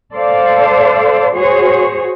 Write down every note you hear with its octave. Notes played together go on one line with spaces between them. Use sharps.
A4 C5 D5 F5
F#4 G#4 C5 C#5